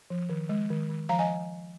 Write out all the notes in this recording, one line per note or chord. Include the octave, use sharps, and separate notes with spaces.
F3
D#3
G#3
D#3
D#3
F3 F5 A#5
D#5 G#5